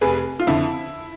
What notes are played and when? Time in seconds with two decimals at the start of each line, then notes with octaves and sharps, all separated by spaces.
0.01 F1 G#4 B4
0.40 F4
0.47 F2 D3 E4